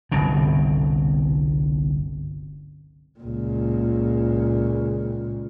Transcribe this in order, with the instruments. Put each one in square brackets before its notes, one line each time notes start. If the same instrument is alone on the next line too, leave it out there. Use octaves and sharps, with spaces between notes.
[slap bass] G1 C2 B2
[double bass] C#2 A#2